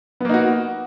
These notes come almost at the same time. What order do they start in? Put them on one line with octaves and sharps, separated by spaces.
B3 A#3 D#4 F#4